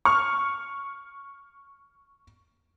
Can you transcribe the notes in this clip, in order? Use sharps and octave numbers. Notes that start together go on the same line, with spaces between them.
C#6 F6